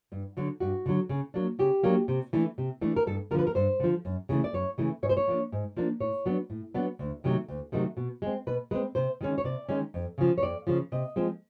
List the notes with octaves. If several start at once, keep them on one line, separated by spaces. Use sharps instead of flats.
G2
D3 F#3
G2 F#4
D3 F#3
C#3
F#3 A#3 D4
C#3 G4
F#3 A#3 D4
C3
E3 A3 D4
C3
E3 A3 D4
A#4
G2 A4
D3 F3 A#4 B4
A#4
G2 C5
D3 F3
F#2
C#3 E3 A3
D5
F#2 C#5
C#3 E3 A3
G#2 C#5
C5
C#5
F3 A#3 D4
G#2
F3 A#3 D4
A2 C#5
F#3 B3 D4
A2
F#3 B3 D4
D2
C3 D#3 F#3 A3
D2
C3 D#3 F#3 A3
B2
G#3 C4
B2 B4
G#3 C4 B4
C3 C5
D#3 G#3 C#4
C#5
C3 D5
D#3 G#3 C#4
F2
C#3 F3
C#5
F2 D5
C#3 F3
C3 D#5
F3 G#3 C4